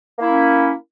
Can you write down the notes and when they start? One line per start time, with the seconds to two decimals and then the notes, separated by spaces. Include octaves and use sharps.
0.18 A#3
0.22 E4
0.26 C#4